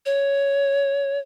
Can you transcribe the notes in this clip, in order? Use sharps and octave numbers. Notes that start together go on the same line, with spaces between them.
C#5